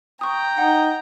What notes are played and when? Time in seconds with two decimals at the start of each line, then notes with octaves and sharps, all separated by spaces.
0.21 G5 A#5 C#6 D#6
0.58 D#4 F#5